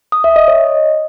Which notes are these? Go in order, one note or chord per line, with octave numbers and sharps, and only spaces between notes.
D#6
E5
D#5
C#5